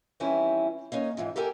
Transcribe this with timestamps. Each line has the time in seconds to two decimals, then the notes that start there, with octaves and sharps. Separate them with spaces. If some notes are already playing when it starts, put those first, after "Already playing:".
0.20 D#3 E3 G3 C4 C#4 E4
0.92 A#3 C#4 D#4 C#5
1.17 F2 G#2 E3 F3
1.36 G4 A4 A#4 G5 G#5